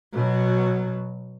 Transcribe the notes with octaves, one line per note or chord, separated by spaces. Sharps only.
B2 F#3